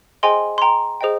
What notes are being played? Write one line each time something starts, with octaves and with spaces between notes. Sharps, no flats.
G#4 C5 D#5 G5 G#5 C6
C6
G5 A#5
G#4 C5 D#5 G5